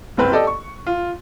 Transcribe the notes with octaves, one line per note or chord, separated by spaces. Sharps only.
F#1 C2 C4 B4
G4 A4 D5 D#5
C#6
F4